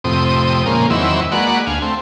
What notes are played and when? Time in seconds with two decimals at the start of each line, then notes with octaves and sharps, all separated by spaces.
0.04 F2 A2 C3 C4 D#6
0.66 A#2 C#3 F3 G#3 A#3
0.90 E2 D#3 E3 F#3 C4 E6
1.32 G#3 A#3 F#4 B4 D5 F#5
1.67 D2 F5 G#5
1.82 A3 C4